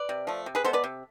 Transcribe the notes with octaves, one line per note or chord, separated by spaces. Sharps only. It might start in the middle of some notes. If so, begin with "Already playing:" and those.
Already playing: B4 D5
C3
F3 A3
C3
G#4 B4
G#3 B3 A4 C5
B4 D5
C3